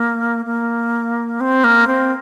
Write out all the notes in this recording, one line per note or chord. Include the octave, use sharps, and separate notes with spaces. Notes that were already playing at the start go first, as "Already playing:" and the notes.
Already playing: A#3
A#3
C4
A#3
C4